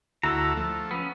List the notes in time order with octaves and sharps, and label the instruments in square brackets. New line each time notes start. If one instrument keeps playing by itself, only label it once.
[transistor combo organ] D2 E4 F#4 [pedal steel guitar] A4 A#5
[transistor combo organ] F3 A3
[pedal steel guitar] B3 C#4